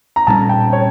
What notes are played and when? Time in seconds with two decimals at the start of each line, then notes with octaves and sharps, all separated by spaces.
0.16 A#5
0.27 A#2 G3 A#3 C#4 A5
0.49 G5
0.73 C#5